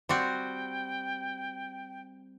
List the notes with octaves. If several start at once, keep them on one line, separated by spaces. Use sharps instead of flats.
G3 C4 F#4 G5